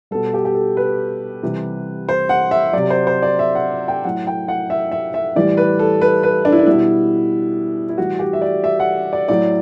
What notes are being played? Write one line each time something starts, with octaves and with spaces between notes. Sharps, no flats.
B2 G3 A4
G4
G4
A4
B4
C3 E3 G3
C5
F#5
E5
C3 F#3 D5
C5
C5
D5
E5
F#5
G5
A2 F#3 F#5
G5
F#5
E5
E5
E5
A2 E3 G3 D5
B4
A4
B4
B4
D4
E4
D4
B2 G3 E4
E4
A2 E3 G3 F#4
G4
E5
D5
E5
F#5
D5
A2 F#3 D5